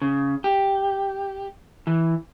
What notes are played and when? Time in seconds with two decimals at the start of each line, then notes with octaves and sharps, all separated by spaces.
0.02 C#3
0.44 G4
1.87 E3